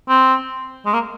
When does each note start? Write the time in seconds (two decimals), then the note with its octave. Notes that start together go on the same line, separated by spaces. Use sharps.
0.09 C4
0.86 G#3
0.94 A#3